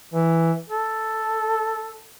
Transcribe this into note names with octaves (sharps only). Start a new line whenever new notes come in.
E3
A4